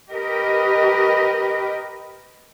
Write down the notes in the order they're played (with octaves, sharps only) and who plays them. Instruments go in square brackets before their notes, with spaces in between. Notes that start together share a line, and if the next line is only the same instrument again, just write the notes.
[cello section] G4 A#4 B4 D#5